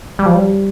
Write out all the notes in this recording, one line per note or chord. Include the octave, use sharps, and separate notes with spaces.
G3
F3
G3